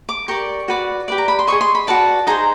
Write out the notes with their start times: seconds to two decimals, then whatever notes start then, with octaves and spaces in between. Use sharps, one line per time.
0.09 D6
0.28 G4 A#4 D5 C#6
0.68 F#4 B4 D5
1.08 G4 B4 D5
1.18 A#5
1.28 B5
1.39 C6
1.47 G#4 C5 D#5 C#6
1.61 C6
1.75 B5
1.87 F#4 B4 D5 A5
2.27 D#4 G#4 C5 A#5